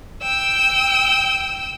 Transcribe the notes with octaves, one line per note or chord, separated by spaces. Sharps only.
G5 E6